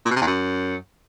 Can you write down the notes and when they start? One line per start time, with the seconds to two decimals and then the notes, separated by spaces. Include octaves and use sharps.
0.05 A#2
0.11 B2
0.16 C3
0.21 E2
0.27 F#2